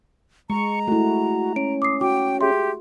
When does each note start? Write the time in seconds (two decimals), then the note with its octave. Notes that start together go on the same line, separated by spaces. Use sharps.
0.50 G#3 A#5 C#6
0.88 A3 E4 F#4
1.56 C#4 D7
1.82 D6 D#6 C7
2.01 F#4 G5 D6
2.41 G4 G#4 E5 C6